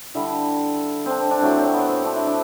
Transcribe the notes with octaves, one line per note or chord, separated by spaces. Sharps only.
D3 G3 E4
C4 D4
C4
D4
A2 F#3 A3 C4
C4
B3
C4
D4
E4
D4